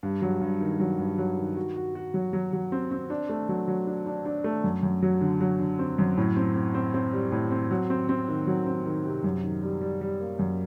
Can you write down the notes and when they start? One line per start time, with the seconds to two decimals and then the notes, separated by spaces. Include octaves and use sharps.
0.03 G2
0.22 F#3
0.41 G2
0.61 D#3
0.80 F#3
0.99 G2
1.18 F#3
1.37 D#3
1.56 F#4
1.76 F#4
1.95 F#4
2.14 F#3
2.33 F#3
2.53 F#3
2.72 C4
2.91 C4
3.10 D4
3.29 A3
3.49 F#3
3.68 F#3
3.87 D4
4.06 D4
4.25 D4
4.44 A3
4.64 F#2
4.83 F#2
5.03 F#3
5.21 D3
5.41 F#3
5.60 D3
5.79 C4
5.98 F#2
6.17 A2
6.37 C4
6.56 C4
6.75 C4
6.94 C4
7.13 G3
7.32 A2
7.51 C4
7.71 F#3
7.90 C4
8.09 C4
8.28 D#3
8.47 F#3
8.66 C4
8.86 D#3
9.05 C3
9.24 F#2
9.44 D#3
9.63 G3
9.81 G3
10.01 G3
10.20 A#3
10.39 F#2